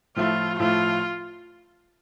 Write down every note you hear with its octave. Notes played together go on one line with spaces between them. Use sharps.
A2 F3 A3 E4 F4
A2 F3 A3 E4 F4